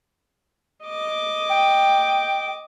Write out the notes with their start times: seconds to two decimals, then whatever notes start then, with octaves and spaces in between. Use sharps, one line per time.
0.85 D#5 D6
1.49 G5